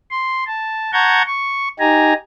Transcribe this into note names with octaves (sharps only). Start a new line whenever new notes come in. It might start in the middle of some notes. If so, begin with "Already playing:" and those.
C6
A5
F#5 A5 A#5 C#6 G6 G#6
C#6
D#4 G4 G#5 A#5